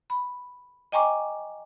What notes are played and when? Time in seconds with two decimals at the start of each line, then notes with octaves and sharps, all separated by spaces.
0.10 B5
0.92 D#5 G5 G#5 A#5 C#6 D6